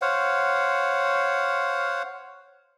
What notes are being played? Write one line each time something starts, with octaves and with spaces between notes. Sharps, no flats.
C5 C#5 F5 F#5